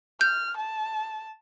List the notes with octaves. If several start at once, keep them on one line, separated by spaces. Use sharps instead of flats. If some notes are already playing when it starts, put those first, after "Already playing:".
F6 G6
A5